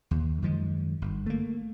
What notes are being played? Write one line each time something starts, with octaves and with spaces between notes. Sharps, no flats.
D#2
F#2 D#3 F3 G#3
G1
A3 A#3